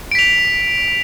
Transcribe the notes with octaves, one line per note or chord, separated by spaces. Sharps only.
B6 D7 F7